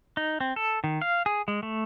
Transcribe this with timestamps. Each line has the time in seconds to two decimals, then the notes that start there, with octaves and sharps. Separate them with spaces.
0.17 D#4
0.41 C4
0.56 A4
0.84 D#3
1.02 F5
1.26 G#4
1.48 G#3
1.63 A3